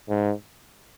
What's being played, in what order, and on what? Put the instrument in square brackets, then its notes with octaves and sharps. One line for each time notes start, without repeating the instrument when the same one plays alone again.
[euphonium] G#2